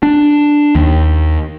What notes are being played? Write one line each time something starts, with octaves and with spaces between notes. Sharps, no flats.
D4
D#2